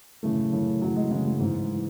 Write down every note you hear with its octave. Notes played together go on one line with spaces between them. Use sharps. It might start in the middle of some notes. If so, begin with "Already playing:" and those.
F#2 A2 C#3 E3 A3
F#2 C#3 E3
F#2 C#3 E3 F#3
G#3
F#2 C#3 E3 G#3
G#3
G#2 E3
E3